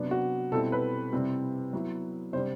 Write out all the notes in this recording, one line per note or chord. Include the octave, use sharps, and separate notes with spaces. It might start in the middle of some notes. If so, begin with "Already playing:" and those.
Already playing: C3 F#3 B3 D4
F#4
B2 G3 C4 E4 A4
B4
C3 G3 C4 E4
F#3 B3 E4
C3 G3 D4 C5